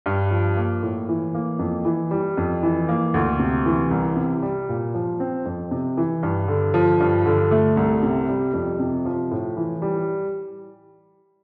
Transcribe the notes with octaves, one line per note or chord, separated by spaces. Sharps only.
G2
F3
A#3
A2
E3
A#3
F2
E3
G3
F2
E3
A#3
D2
C3
E3
C2
C3
G3
A#2
F3
C4
F2
C3
E3
G2
D3
F3
G2
D3
A3
C2
C3
G3
F2
C3
F3
A2
E3
G3